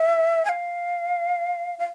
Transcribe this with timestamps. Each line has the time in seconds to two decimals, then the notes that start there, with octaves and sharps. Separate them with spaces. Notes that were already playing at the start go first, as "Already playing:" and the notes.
Already playing: E5
0.45 G#5
0.50 F5
1.79 F5